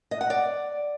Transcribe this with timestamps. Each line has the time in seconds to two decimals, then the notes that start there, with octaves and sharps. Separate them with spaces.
0.11 D#5
0.21 F#5
0.30 D5